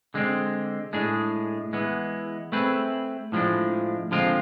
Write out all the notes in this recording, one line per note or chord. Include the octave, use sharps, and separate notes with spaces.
D3 G#3 C4
A2 G#3 D4 G#4
E3 G#3 B3
A3 C4 G#4 B4
A2 F3 G#3 D4
D3 F3 G#3 C4 F4